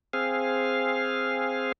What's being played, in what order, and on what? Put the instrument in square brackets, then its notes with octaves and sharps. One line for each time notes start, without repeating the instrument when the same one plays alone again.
[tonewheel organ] C4 G#4 F5